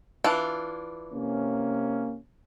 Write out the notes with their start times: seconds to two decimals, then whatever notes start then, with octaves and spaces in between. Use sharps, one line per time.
0.24 E3 D4 F4
1.12 C3 A#3 C#4